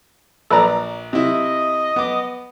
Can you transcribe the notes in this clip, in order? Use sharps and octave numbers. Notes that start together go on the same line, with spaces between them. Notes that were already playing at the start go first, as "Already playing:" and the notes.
A#1 A4 B4 D5 A#5
C3 E4 D#5
B3 D6